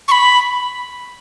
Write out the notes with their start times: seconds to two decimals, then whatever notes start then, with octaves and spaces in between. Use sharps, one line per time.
0.08 C#6
0.11 B5